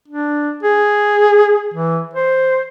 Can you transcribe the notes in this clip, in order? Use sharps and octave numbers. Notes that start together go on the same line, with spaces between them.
D4
G#4
E3
C5